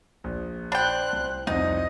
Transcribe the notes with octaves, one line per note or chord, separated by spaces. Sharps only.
A#1
D4 C5 G5 B5 F#6
C2
C2 F2 D#4 C5 D#5